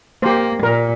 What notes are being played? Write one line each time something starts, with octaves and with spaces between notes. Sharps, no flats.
A#3 G4 C5
A#2 A#4